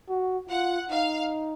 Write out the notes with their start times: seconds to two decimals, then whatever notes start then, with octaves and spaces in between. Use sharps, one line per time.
0.09 F#4
0.50 F4 F#5
0.90 D#4 F5